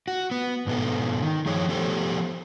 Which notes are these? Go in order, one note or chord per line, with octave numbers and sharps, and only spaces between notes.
F#4
B3
G#2 B2 B3 A4
D#3
G2 F3 G#4 C#5
F3 B3 G4 A4 C5 C#5